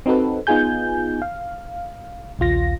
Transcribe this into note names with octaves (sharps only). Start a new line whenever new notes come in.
C4 D#4 F#4 A4 B4
B3 D#4 F4 G#4 G#5 G6
F5
A#1 D#2 F4 A#6